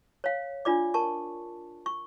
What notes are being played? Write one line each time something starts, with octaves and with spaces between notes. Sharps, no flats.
C#5 F5
D4 F4 D5 D6
A#4 A5 C#6
C#6